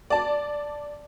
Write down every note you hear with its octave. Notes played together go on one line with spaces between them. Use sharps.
D5 A5